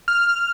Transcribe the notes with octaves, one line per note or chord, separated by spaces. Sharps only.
F6